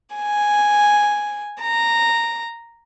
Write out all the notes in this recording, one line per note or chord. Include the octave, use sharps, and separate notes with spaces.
G#5
A#5